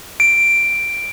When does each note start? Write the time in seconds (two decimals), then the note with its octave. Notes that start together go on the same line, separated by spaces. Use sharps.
0.20 D7